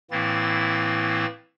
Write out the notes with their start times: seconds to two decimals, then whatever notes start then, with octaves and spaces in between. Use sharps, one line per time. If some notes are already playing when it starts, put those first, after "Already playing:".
0.11 A2 E3 A#3 C4 E4 A6